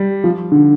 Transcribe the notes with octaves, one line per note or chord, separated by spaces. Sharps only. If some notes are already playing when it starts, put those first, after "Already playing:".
Already playing: G3
F3
D3